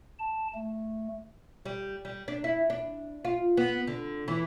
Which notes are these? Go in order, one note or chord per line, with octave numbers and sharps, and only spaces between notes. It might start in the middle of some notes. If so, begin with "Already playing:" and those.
A5
A3
G3
G3
D4
E4
D4
F4
B3
D3
E3